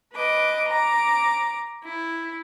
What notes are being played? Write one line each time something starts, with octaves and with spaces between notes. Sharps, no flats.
B4 D#5 D6
A#5 D6
E4